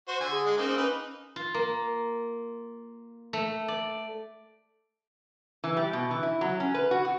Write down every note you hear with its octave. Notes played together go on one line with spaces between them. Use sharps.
F#4 C5
D3 G#5
G#4
G#3
A#3 C4 C#4 D#4
C#4 D#4 B4
F4
A#3
A3
D5
E3
G3
B2
E3
E4
F#3
C#4
B4
F#4
F#4